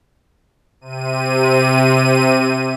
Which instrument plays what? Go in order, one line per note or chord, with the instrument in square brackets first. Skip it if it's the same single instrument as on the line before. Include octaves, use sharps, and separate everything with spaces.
[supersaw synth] C3 D#7